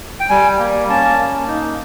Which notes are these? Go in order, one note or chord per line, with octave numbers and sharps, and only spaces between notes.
G5
G3 G#5
A#3
C#4 A5
A#3
D#4